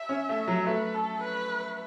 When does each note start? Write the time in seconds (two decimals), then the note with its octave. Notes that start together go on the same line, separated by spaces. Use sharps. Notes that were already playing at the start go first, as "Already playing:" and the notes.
Already playing: E5
0.09 C#4
0.29 A3
0.47 F#3
0.67 A3 B4
0.94 A4
1.22 B4